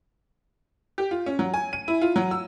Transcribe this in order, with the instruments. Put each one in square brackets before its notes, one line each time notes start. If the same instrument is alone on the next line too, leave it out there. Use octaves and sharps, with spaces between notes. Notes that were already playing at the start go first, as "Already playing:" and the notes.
[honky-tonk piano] G4
F4
C#4
F#3
G#5
D#7
E4
F4
F#3
E6